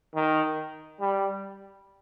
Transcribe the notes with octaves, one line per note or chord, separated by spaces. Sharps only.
D#3
G3